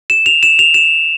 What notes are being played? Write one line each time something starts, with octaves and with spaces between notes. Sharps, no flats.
E7
F7
E7
F7
E7